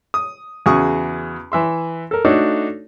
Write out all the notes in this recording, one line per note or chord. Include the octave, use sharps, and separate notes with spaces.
D#6
E2 C#3 F#4 G#4 C#6 D#6
E3 E5 C6
A4 A#4
A3 D4 D#4 F#4 A4 C#5